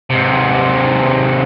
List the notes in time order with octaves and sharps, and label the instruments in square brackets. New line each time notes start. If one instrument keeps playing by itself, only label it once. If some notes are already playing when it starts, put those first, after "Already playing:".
[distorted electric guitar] G#2 C3